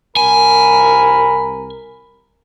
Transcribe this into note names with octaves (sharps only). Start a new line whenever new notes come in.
C2 A#4 G#5 B5